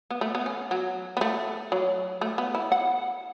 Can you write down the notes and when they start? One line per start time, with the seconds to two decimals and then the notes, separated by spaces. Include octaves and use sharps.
0.10 B3
0.21 A3
0.35 B3
0.46 C#4
0.71 F#3
1.17 B3
1.21 A3
1.72 F#3
2.21 A3
2.38 B3
2.55 E4
2.72 F#5